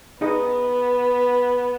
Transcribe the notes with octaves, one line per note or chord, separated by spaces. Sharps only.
B3 D#4 G#4 D#5